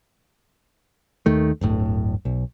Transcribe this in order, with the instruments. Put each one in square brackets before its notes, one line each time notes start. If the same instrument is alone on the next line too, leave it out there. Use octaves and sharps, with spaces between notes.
[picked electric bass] D#2 D#3 A3
D1 G1 A2
B1